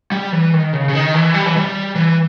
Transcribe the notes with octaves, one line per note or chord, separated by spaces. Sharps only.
G3
E3
D#3
C#3
C#3
D#3
E3
G3
E3
G3
E3